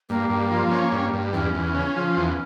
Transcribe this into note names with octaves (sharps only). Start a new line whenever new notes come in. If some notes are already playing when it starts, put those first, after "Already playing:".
G2 A#3
G2
F3
C#4
G2
G2
E2 C#4
E2
C#3
F3
E2